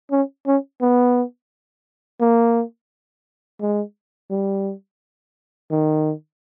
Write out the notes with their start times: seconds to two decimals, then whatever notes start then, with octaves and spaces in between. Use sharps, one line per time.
0.11 C#4
0.47 C#4
0.81 B3
2.21 A#3
3.61 G#3
4.31 G3
5.71 D#3